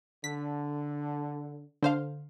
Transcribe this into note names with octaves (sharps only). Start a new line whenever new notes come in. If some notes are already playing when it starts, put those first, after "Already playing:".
D3 B6
D3 C5 F5